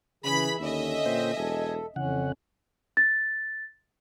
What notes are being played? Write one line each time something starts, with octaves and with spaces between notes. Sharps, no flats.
C#3 E3 G#4 B5
D#2 D3 C#4 D#5 E5
A#2 C5 G5
E1 A4 G#5
F2 C#3 E3 C#4 F#5
A6